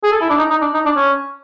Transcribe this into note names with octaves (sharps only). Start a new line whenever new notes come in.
G#4
A4
E4
D4
D#4
D#4
D4
D#4
D4
C#4